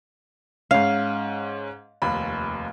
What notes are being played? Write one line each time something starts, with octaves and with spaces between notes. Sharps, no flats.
G#2 C#4 F5
F1 D#2 B5